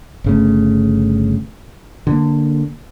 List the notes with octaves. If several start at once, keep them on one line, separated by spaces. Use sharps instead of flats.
G1 C#3 A3
D3 A#3